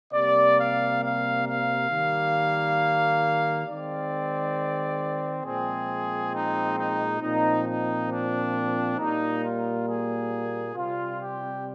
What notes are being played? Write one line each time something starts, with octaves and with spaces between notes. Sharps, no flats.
C3 G3 A#3 D5
F5
F5
F5
D#3 G3 A#3
D#3 G#3 C4 D5
A#2 F3 G#3 C4 G#4
D#4
D#4
A#2 F3 C4 D#4
D#4
D4
A#2 G3 A#3 D#4
F4
G#4
C3 G3 C4 F4
G4